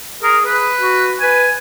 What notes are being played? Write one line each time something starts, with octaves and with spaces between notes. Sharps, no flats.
G#4 A#4
G#4 B4
F#4
B4 G#5